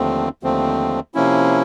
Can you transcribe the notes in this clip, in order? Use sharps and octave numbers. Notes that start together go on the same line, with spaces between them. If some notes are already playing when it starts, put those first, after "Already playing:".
Already playing: D#2 D3 F3 A3 C4
D#2 D3 F3 A3 C4
C3 F3 A#3 C#4 E4